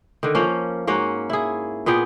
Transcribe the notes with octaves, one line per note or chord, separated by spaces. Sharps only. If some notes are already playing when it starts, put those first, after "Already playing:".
D3 D#3
F3 A#3 C#4
G#2 A#3 C#4 F#4
E4 G#4
A#2 B3 G#4 G5